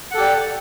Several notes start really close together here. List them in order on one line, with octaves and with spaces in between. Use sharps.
F#5 A4 G4 D5